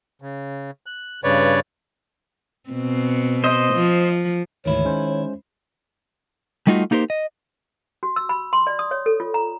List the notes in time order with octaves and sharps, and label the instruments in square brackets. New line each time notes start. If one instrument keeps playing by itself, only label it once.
[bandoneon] C#3
F#6
G2 C#3 B4 C#5 D5
[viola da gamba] B2 C4
[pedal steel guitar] C5 D#5
[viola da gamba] F3
[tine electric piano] D2 G#2 E3 [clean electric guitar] D#3 E4 [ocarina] C#5
[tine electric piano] G#3 C#4 C5
[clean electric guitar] G3 A3 D#4 F4 F#4
A#3 D#4 G4 A#4 C5
D#5
[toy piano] F#4
E6
B5
C6
D5
D#6
C#5
A4
F4
A#5